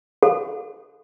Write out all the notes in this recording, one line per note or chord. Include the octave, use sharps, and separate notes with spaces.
A4